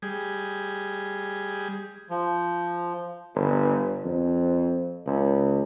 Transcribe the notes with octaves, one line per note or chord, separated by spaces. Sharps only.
G3 G#4
F3
G1
F2
C#2